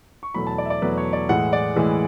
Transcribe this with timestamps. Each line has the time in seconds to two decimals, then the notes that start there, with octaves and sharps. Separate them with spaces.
0.23 C#6
0.34 E2 B2 F#3 A3 B5
0.47 A5
0.58 D5
0.65 E5
0.70 D5
0.82 E2 B2 F#3 A3 B4
0.98 C#5
1.13 D5
1.29 A2 E3 G#3 F#5
1.53 D5
1.76 A2 E3 G#3